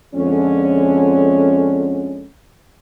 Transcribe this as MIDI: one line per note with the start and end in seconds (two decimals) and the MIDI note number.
0.15 2.27 41
0.15 2.27 50
0.15 2.27 56
0.15 2.27 61